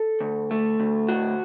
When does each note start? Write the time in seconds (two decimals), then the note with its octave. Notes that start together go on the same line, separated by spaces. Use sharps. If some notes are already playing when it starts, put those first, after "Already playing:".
Already playing: A4
0.21 D2
0.51 A3
0.79 D2
1.09 A2 F#4